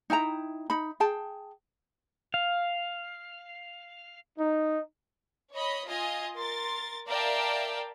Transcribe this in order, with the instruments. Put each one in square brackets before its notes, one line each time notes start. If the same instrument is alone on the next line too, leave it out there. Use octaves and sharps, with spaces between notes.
[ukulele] D#4 E4 G5 A#5
D#4 B5
G#4 G5 A5
[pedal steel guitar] F5
[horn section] D#4
[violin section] C#5 D#5 B5
F4 D#5 G#5
A#4 C6 A6
A#4 D5 E5 F5 G5 A5